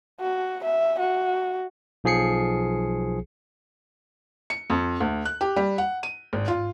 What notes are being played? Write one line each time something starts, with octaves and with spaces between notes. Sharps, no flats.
F#4
E5
F#4
B1 F3 G#4 C7 C#7
C#7
F2
D2
F#6
G4
G3
F#5
D#7
G#1
F4